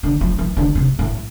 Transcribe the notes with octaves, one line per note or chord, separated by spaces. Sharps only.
D3
F3
E3
D3
C3
A2